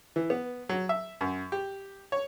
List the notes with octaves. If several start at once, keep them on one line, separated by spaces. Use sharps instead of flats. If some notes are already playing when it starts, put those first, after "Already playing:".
E3
B3
F#3
E5
F#2
G4
C#5